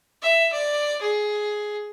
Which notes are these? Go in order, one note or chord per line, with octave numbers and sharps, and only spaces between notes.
E5
D5
G#4